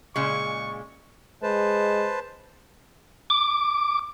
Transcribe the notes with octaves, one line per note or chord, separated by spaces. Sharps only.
A#2 C#3 G#3 C#6
G#3 B4 C5 A5
D6